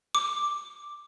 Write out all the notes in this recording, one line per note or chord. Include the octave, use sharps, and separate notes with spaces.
D6